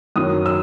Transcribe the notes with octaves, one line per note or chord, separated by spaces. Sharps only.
F#2 D#3 F#3 D#6
E6